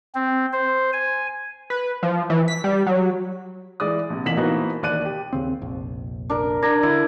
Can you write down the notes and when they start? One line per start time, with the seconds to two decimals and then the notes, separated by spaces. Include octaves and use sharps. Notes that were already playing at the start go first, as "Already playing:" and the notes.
0.15 C4
0.53 C5
0.93 G#5
1.70 B4
2.03 F3
2.30 E3
2.48 B6
2.64 G3
2.86 F#3
3.80 E3 G#3 D5 D#6
4.10 A#1 C3
4.25 E1 A1 A#2 B6 E7 F#7
4.37 E3 F3 A#3 B3 D#4 F#4
4.82 E1 D#2 D5 F#6 D#7
5.05 G4
5.33 D#2 C#3 C4
5.61 F1 A#1
6.30 D4 A#4
6.62 D4 A#4 A#5 G#6 A#6
6.83 D3 E4 G#6